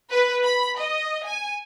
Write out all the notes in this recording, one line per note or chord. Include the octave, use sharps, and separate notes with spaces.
B4
B5
D#5
G#5